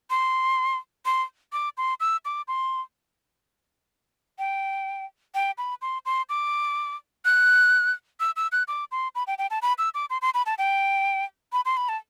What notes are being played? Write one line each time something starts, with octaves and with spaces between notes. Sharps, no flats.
C6
C6
D6
C6
E6
D6
C6
G5
G5
B5
C6
C6
D6
F#6
E6
E6
F#6
D6
C6
B5
G5
G5
A5
B5
E6
D6
C6
C6
B5
A5
G5
B5
C6
B5
A5